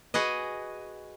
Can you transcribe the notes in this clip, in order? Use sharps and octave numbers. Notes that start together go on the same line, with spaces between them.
F#4 G#4 B4 D#5